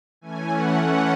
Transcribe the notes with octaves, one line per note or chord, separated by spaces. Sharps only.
E3 A3 C#4 G#5
F#5
E3 A3 C#4 F#5